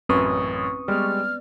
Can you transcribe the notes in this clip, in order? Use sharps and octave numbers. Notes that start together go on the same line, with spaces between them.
A1 F#2 C4 C#4 B4 C#6 D#6
G3 G#3 B3 D5 F6